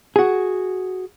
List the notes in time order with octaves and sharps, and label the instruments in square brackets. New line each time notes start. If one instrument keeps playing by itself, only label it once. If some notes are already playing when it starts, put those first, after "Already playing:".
[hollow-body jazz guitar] F#4 G#4